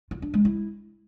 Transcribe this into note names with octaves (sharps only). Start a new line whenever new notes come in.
F4
D4
G#3
E4